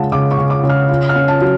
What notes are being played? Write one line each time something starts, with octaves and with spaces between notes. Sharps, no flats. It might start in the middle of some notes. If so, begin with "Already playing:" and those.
Already playing: C#3 G#3 C#4 F5 F#5 A5
C#3 D6
C#6
C#3
D6
C#3
F6
F4
F6
C#4
A5
F#3